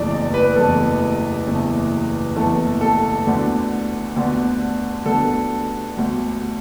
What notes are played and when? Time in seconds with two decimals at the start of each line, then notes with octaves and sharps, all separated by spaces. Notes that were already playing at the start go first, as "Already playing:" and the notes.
Already playing: F#1 E2 E3 A3 D5
0.11 D5
0.34 B4
0.56 F#1 E2 E3 A3 A4
1.46 F#1 E2 E3 A3
2.36 F#1 E2 E3 A3 A4
2.81 A4
3.26 D2 D3 B3 D4
4.16 D2 D3 B3 D4
5.05 D2 D3 B3 D4 A4
5.95 D2 D3 B3 D4